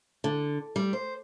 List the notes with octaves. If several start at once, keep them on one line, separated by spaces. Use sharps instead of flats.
D3
G3
C5